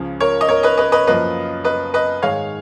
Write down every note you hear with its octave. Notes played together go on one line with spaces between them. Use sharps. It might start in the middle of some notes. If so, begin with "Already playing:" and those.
Already playing: C#2 C#3 F3
A#4 C#5
D#5
A#4 C#5
B4 D#5
B4 D#5
B4 D#5
F#2 F3 A#3 B4 D#5
B4 D#5
B4 D#5
G#2 D#3 G#3 C#5 F5